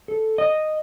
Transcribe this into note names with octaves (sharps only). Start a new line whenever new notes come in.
A4
D#5